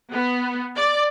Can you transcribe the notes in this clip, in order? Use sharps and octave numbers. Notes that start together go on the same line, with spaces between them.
B3
D5